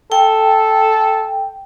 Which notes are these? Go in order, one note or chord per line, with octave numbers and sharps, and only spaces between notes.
A4 G5